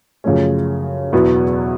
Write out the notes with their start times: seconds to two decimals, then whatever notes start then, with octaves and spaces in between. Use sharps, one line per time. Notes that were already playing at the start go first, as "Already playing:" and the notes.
0.24 F#2 C#3 F3 A3 C#4
1.12 E2 B2 F#3 B3 E4